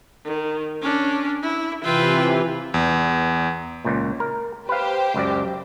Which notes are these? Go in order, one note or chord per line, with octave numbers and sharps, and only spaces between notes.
D#3
C#4 D4
E4
C3 E3 F4 B4 E5 G5
E2
C#2 A#2
A#4
G4 B4 C5 F5
C#2 F#2 D5